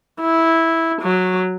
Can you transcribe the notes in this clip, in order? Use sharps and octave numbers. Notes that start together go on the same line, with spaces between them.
E4
F#3